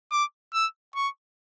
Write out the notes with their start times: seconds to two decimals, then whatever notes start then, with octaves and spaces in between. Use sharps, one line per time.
0.12 D6
0.54 E6
0.95 C#6